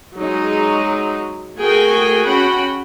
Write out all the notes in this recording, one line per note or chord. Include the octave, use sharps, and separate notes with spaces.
F#3 G#3 D#4
A3 F#4 G#4 A#4 G5 G#5
C#4 F#4 F#5 G5 B5